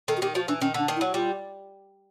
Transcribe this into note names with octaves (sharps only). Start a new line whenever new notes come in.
D#3 A4
F#4
D#3 G4
F3 F#4
E3 D4
D#3 C#4
D3 D4
D#3
E4
F#3
G3 F4